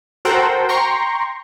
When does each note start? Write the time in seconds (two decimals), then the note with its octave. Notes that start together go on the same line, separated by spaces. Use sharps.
0.25 F#4 A4 A#4 C5 F#5 G5
0.69 G5 A#5 C6 C#6